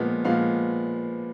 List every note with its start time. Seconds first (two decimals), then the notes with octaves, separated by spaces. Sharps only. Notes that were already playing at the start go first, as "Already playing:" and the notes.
Already playing: A#2 F3 G#3 B3
0.24 A#2 F3 G#3 B3 F5